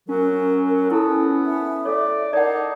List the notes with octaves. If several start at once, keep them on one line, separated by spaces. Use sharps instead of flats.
F#3 C#4 A#4
A#4
B3 E4 A4 A5
E5
A4 C#5 D5
D#4 A#4 D5 F#5 A5